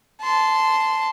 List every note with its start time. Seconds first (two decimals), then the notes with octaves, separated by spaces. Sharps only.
0.22 A5 C6